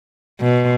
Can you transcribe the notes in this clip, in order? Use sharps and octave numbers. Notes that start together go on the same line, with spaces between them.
B2